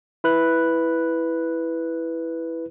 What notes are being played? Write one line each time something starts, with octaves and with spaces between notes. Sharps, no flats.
E4 B4 F#6